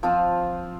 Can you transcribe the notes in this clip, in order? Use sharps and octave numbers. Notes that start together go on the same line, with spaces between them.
F3 C4 F4